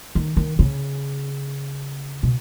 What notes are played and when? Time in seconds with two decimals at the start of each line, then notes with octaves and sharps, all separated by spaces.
0.15 D#3
0.37 D#3
0.59 C#3
2.23 B2